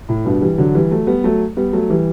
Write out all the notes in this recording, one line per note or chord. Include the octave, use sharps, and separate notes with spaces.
A2
G2 B2
E3 G3
D3 F#3
E3 G3
F#3 A3
G3 B3
F#3 A3
G3 B3
F#3 A3
E3 G3